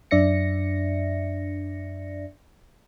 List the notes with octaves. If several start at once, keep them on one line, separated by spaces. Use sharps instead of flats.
F#2 D4 D5 E5 A#6 C#7